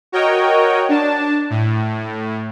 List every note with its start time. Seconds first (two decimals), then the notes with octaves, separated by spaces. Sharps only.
0.12 F#4 A#4 C#5 D#5 G5
0.89 D4 A5
1.50 A2